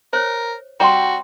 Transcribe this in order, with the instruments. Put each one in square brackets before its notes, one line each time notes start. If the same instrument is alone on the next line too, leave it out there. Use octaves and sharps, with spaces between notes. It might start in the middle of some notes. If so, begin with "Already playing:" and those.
[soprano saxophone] A#4 [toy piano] C5 C#5
[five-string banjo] G3 C4 G4 [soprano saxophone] F#4 [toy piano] A#5 C6